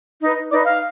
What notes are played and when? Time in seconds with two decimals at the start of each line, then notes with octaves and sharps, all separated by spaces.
0.21 D#4 B4
0.50 D#4 B4 D5 D6
0.65 F5 F6